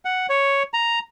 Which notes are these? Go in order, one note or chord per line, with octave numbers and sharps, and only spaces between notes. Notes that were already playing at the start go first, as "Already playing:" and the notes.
F#5
C#5
A#5